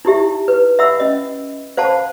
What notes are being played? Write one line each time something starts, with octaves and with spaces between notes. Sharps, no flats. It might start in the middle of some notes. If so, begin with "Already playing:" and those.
D#4 E4 G4 E5
B4
E5 F#5 B5 E6
C#4 D#5
C5 F5 F#5 A5 B5